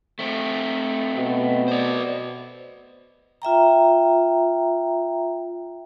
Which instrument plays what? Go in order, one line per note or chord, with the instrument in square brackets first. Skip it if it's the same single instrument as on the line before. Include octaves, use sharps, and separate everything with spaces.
[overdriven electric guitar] A3 C4
[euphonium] B2
[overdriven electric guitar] C5 D5
[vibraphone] F4 E5 G5 A#5